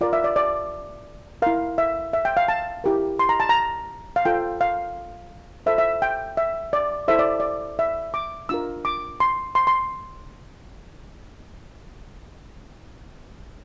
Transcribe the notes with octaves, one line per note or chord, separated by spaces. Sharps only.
F4 A#4 D5
E5
D5
D5
E4 A#4 F5
E5
E5
G5
F5
A5
E4 G4 A#4
C6
A#5
A5
A#5
F5
F4 A4 C5 G5
F5
F4 A4 C5 E5
E5
G5
E5
D5
E4 A4 C5 E5
D5
D5
E5
D6
D4 F4 A#4 E6
D6
C6
C6
C6